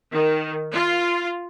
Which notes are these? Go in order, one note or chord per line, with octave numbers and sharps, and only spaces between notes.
D#3
F4